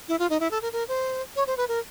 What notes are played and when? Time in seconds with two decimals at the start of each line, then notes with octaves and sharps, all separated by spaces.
0.08 E4
0.19 F4
0.30 D#4
0.40 E4
0.51 A4
0.62 A#4
0.73 A#4
0.88 C5
1.36 C#5
1.47 C5
1.57 B4
1.68 A#4